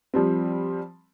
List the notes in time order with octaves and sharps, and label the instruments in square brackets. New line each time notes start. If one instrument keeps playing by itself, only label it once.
[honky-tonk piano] F3 G3 C4